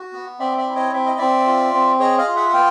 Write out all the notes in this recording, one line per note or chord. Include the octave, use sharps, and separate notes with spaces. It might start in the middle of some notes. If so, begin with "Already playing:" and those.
Already playing: F#4
B3
C4 D5 E5
D5 E5
E4
C#5 D#5
C4 E5
D#5
C4 D5 E5
F4
C4
G#4 C#5 D#5
D#5 F5
F4
E5 F#5
F#5
B3 F5 G5